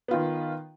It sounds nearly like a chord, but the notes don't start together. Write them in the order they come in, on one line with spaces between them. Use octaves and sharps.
B3 F4 D#3